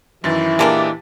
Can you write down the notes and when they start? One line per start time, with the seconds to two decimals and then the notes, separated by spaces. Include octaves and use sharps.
0.24 F#2 D#3 E3 A6
0.59 A#2 G#3 A#3 D4 G4 A5